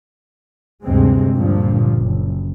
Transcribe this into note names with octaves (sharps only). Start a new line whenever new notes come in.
D2 G2 C3 G#3 C4
G2 A#2 D3 F3
F#1